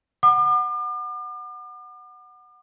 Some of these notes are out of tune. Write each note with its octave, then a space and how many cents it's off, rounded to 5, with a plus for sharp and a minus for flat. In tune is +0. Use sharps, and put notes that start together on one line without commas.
F#5 +0 D6 +40